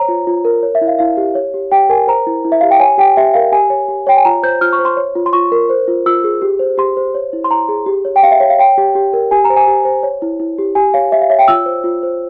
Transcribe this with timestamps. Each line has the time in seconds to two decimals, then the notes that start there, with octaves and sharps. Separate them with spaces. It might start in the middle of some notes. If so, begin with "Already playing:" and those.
Already playing: C5 C#5 A#5
0.08 F4
0.27 F4
0.45 A#4
0.63 C#5
0.75 E5
0.81 E4
0.88 F5
0.99 E4 F5
1.17 G4
1.35 C#5
1.54 G4
1.72 G4 G5
1.89 A#4 G#5
2.07 C5 A#5
2.27 E4
2.45 E4
2.52 E5
2.61 G4 F5
2.71 G5
2.80 C#5 G#5
2.98 G4 G5
3.17 G4 E5
3.34 A#4 F5
3.52 G4 G#5
3.70 C#5
3.88 G4
4.07 C#5 G5
4.17 G#5
4.25 F4 A#5
4.43 C5 G6
4.61 F4 F6
4.73 C#6
4.79 C5
4.85 C6
4.97 C#5
5.15 F4
5.26 C6
5.33 F4 C#6
5.52 A#4
5.69 C5
5.88 F4
6.06 F4 E6
6.24 G#4
6.42 G4
6.59 C5
6.78 G4 C6
6.97 C5
7.15 C#5
7.33 E4
7.44 C6
7.50 E4 A#5
7.69 G#4
7.86 G4
8.05 C#5
8.16 G5
8.23 G4 F5
8.31 E5
8.40 C#5
8.50 F5
8.58 C#5 G5
8.78 G4
8.95 G4
9.13 A#4
9.31 G4 G#5
9.45 A#5
9.50 C5
9.56 G#5
9.67 G4
9.85 C5
10.03 C#5
10.22 E4
10.40 E4
10.58 G4
10.75 G4 G#5
10.94 C#5 F5
11.12 G4 E5
11.22 F5
11.30 C#5 E5
11.39 G5
11.48 F4 E6
11.66 C5
11.84 F4
12.03 C5